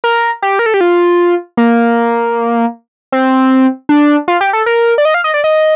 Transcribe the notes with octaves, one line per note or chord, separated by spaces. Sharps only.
A#4
G4
A#4
A4
G4
F4
A#3
C4
D4
F4
G4
A4
A#4
D5
D#5
F5
D#5
D5
D#5